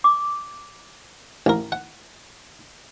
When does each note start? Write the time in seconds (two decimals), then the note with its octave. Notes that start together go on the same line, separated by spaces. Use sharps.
0.04 D6
1.46 A1 A#4
1.72 F#5